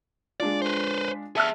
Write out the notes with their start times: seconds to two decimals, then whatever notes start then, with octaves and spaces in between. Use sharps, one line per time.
0.40 G#3 D4 F4 D5
0.62 B4 C5
1.36 G#4 E5 A5 E6 F6